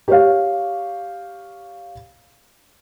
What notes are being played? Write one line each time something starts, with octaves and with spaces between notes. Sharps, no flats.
G4 C#5 F5